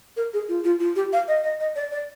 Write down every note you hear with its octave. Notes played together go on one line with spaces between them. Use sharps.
A#4
G#4
F4
F4
F4
G4
F5
D#5
D#5
D#5
D5
D5